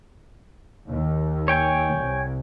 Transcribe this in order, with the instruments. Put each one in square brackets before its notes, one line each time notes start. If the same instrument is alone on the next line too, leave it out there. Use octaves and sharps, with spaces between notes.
[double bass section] D#2
[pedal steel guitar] C#5 G5 G#5
[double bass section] C2